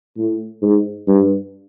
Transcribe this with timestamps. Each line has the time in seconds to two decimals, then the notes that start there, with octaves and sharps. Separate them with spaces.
0.17 A2
0.62 G#2
1.07 G2